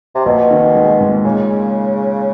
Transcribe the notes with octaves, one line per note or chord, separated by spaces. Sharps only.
C3
A#1 B2
D#3
G#3
G#2
A#2 C#3